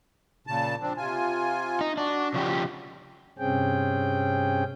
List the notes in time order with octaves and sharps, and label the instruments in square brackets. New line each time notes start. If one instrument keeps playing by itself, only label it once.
[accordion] A#2 C#3 A5
F3 C4 D4
C3 F4 G#5
[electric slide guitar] D#4
[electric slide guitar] D4 [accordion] F#4
[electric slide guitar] C#3 F3 G4
[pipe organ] G2 C3 C4 C#4 G#4 G5